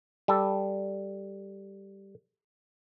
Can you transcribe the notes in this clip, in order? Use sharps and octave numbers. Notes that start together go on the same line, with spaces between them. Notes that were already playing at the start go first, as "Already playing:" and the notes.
G3 A4